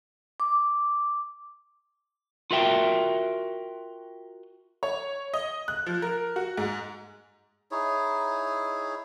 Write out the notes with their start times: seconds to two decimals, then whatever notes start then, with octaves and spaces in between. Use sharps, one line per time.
0.40 D6
2.51 F4 F#4 A#4 E5 G5
4.83 C#5
5.34 D#5
5.68 F#6
5.86 F3
6.02 A#4
6.36 F#4
6.57 G#2
7.71 D#4 E4 G#4 C#5